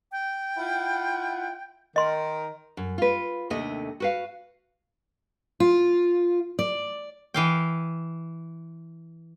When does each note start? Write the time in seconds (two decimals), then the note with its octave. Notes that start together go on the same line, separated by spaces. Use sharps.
0.12 G5
0.57 E4 F4 F#5
1.96 D#3 A#4 D#5 C6
2.77 F#2
2.98 F4 B4
3.50 D#2 C3 A3 D4 D#5
4.00 F#4 B4 F5
5.60 F4
6.59 D5
7.34 E3 F5 G5